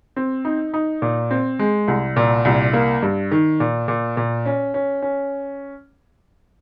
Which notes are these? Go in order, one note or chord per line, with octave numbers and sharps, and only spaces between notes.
C4
D#4
D#4
A#2
C4
G#3
C2
A#2
C2
A#3
G2
D#3
A#2
A#2
A#2
C#4
C#4
C#4